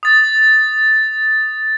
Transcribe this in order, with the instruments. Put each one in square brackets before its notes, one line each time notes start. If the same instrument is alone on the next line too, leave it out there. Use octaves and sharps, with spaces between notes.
[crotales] D#6 A6